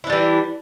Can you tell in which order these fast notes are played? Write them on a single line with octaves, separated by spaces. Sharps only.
E4 D4 G3 E3